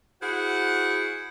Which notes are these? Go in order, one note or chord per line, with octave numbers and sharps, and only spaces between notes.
E4 F#4 G#4 C5 F#5